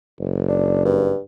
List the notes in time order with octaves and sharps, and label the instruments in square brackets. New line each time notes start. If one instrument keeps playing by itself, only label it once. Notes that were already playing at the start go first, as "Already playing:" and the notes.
[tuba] F#1
[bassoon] D4
G2